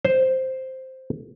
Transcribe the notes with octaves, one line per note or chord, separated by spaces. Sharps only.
C5